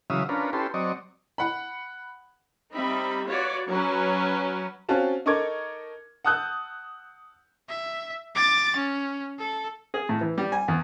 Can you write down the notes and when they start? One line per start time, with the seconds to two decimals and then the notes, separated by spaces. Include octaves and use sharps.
0.10 C#3 E3 F#3 E5 F5 D#6
0.29 C#4 D4 F4 A#4 B4
0.53 C#4 E4 G4 A4 B4 C6
0.74 F#3 C4 D5 D#5 C#6
1.38 F#5 B5
2.74 G3 C4 D#4 E5 B5
3.27 F4 F#4 B4 C#5 D5
3.69 F#3 C#4 B4
4.89 C4 C#4 F4 F#4 A5
5.26 D#4 A4 A#4 C#6 D6 G#6
6.25 F#5 A5 D#6 E6 F#6 G6
7.69 E5
8.35 D6 A6
8.76 C#4
9.39 A4
9.94 G#4
10.09 A2
10.21 E3
10.38 G3
10.52 G#5
10.68 E2